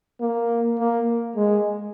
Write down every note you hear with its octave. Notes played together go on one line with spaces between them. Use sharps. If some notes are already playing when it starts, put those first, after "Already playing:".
A#3
A#3
G#3